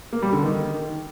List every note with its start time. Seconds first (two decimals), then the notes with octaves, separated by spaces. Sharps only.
0.13 A#3
0.23 G3
0.33 D3
0.43 D#3